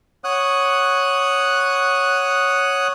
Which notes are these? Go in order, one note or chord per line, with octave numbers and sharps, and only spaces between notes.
C#5 F#5 D#6 F#6